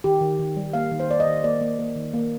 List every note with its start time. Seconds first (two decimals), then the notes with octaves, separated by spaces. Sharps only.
0.04 D#3 G4
0.21 D#3
0.39 D#3
0.57 G3
0.73 A#3 F5
0.91 D#3
1.00 C5
1.09 A#3 D5
1.20 D#5
1.27 D#3
1.44 A#3 D5
1.61 A#3
1.79 A#3
1.96 D#3
2.14 A#3